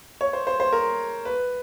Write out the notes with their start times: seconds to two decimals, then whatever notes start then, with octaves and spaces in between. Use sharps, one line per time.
0.21 C#5
0.33 C5
0.47 C5
0.60 C5
0.73 A#4
1.25 B4